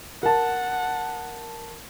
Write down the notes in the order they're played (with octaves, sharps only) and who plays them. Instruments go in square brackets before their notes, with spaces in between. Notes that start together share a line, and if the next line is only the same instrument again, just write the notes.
[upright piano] A#4 A5 [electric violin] F#5